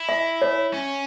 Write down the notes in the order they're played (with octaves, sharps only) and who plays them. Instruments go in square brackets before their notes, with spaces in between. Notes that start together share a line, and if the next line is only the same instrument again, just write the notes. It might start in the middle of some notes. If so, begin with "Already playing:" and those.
Already playing: [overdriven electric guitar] E4
[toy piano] E5
C#5
[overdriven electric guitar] C#4